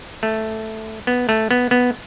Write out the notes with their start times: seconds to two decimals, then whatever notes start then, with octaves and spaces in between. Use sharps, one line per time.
0.23 A3
1.07 B3
1.29 A3
1.51 B3
1.71 B3